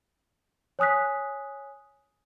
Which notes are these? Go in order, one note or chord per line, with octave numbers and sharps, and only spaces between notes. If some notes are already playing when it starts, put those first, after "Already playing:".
C#5 G#5 D#6 F#6 B6